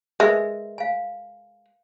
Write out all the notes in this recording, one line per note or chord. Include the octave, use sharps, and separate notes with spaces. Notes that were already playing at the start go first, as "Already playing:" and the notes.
G#3 A#4 B4 E5
F5 G#5